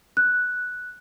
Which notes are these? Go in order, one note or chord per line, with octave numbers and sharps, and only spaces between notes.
F#6